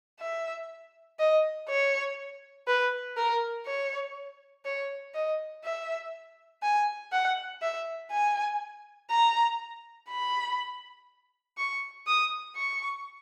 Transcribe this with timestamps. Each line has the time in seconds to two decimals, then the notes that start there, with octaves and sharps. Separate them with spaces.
0.21 E5
1.19 D#5
1.69 C#5
2.68 B4
3.17 A#4
3.66 C#5
4.65 C#5
5.15 D#5
5.64 E5
6.63 G#5
7.12 F#5
7.62 E5
8.11 G#5
9.10 A#5
10.09 B5
11.58 C#6
12.07 D#6
12.56 C#6